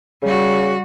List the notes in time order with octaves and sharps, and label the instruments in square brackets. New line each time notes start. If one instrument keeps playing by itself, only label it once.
[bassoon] C#3 [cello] G3 F#4